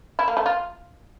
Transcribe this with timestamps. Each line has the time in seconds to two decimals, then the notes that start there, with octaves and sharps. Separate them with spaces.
0.19 E4
0.28 A#3
0.37 A3
0.46 F4